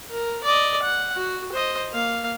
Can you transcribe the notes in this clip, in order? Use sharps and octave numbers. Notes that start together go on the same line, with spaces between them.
A#4
D5 D#5
F#5
F#4
C5 D#5
A#3 F5